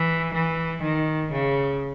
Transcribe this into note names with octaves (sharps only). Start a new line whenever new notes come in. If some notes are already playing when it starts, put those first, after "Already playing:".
Already playing: E3
E3
D#3
C#3